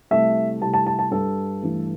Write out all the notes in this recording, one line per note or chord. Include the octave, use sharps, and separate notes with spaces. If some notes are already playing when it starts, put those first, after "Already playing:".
C2 C3 A3 E5
C2 C3 A3 A5
A5
A5
A5
G2 G3 A4
G2 E3 A3